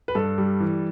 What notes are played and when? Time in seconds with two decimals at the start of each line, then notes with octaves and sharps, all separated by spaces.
0.08 B4
0.15 G2 A4
0.38 G3
0.60 E3